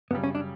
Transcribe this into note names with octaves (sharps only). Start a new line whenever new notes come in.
F#2 C#3 G3 B3
C#4
D4